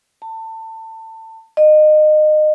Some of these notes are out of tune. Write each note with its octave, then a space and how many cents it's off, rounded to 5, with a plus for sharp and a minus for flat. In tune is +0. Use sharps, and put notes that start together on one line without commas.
A5 +25
D#5 -25